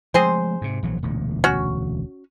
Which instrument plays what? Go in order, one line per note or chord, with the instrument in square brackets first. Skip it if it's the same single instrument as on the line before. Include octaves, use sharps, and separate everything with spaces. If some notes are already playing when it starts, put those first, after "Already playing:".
[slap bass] F3 G#3 A3 [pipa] C4 G#4 C5
[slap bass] G#2 C3
A#1 E3 F#3
E1 D2 A#2
[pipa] C#4 F#4